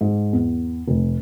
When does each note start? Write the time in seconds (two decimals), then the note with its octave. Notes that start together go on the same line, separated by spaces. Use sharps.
0.01 G#2
0.33 E2
0.87 F1